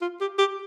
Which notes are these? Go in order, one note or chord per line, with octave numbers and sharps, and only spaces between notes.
F4
G4
G4